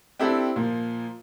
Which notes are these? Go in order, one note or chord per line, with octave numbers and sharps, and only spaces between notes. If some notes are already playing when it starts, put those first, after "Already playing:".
C4 D4 E4 G4 A4
A#2 F3